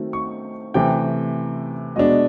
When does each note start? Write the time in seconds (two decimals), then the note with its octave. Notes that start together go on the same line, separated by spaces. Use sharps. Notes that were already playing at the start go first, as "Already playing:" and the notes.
Already playing: D#3 F#3 A3 C4
0.13 C#6
0.74 C3 E3 A3 G5
1.96 B2 G#3 B3 D4 D#5